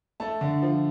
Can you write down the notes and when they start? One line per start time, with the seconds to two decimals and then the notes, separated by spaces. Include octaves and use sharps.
0.20 A3 A5
0.41 D3
0.62 F3